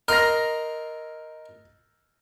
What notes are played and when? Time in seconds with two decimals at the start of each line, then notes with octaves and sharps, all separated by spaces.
0.08 A#4 D#5 C6 F6 A#6